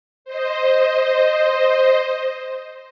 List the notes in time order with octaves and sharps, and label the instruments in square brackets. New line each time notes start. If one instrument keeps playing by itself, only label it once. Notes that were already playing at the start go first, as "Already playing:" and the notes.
[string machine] C5 D#5